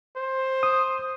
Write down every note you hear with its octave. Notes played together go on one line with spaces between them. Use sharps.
C5
D#6